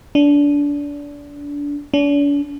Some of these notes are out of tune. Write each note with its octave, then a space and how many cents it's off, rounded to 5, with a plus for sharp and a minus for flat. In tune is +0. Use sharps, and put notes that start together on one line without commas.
D4 -25
D4 -45